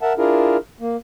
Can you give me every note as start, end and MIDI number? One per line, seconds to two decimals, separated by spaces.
0.01 0.13 70
0.01 0.13 76
0.01 0.13 78
0.01 0.13 81
0.18 0.57 62
0.18 0.57 64
0.18 0.57 65
0.18 0.57 68
0.18 0.57 70
0.80 0.96 58